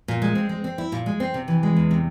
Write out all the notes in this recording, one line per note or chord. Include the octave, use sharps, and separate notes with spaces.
A#2
G#3
C4
G#3
C4
E4
A#2
G#3
C4
C3
E3
G#3
E2
C3